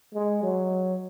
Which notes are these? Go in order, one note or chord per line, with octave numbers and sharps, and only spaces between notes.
G#3
F#3